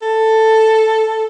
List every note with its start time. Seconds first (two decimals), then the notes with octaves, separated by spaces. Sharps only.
0.02 A4